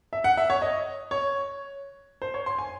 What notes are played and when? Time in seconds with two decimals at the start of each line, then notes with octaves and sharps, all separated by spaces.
0.13 E5
0.24 F#5
0.37 E5
0.50 C#5
0.62 D#5
1.11 C#5
2.22 C5
2.34 C#5
2.46 C6
2.58 G#5